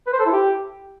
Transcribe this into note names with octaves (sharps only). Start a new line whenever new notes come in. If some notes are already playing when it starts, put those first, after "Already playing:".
B4
C5
A4
E4
G4